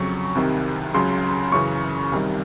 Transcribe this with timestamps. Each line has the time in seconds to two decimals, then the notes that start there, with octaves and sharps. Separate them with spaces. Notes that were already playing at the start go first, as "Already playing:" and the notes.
Already playing: F2 C#3 F#3 C#6
0.35 C2 C3 D#3
0.94 C#2 C#3 F#3 C6
1.52 F#2 C#3 E3 C#6
2.12 C2 C3 D#3 G3